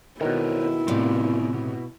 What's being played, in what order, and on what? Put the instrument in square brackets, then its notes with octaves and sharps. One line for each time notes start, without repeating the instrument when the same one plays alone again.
[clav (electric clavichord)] B2 D#3 [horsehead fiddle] E4 [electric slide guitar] A4 A#4 C#5
[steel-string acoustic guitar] A2 C3 [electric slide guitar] B3 F4 D5
[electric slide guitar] B2